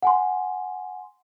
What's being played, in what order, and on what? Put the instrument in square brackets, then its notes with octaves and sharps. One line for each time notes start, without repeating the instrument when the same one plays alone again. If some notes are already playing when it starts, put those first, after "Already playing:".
[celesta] F#5 G#5 C6